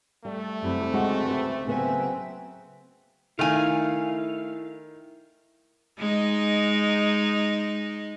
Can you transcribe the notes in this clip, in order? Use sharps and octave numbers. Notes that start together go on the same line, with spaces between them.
G3 A3
F#2 C3 E4
D2 C#3 G#3 C4 F#4 G4
G4 B4
C#3 F#3 B3 C4 E5 G#5
D#3 A3 E4 F5 G#5 F7
G#3 D#4